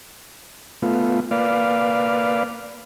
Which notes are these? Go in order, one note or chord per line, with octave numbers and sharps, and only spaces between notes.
A3 B3 F4
A#3 B4 D5 F5